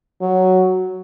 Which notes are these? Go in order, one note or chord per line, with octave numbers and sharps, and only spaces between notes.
F#3